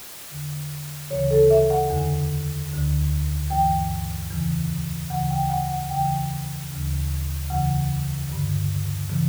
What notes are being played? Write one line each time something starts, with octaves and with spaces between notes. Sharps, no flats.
E2 D3
D2 C#3 E3 C#5
A4
E5
F#5
E2 D3
D2 D3
G2 E3 G5
E2 C#3 E3
D2 C#3 E3 F#5
G5
F#5
F#5
E2 C#3 E3 G5
D2 C#3 E3
E2 C#3 E3 F#5
G2 D3
C#3 E3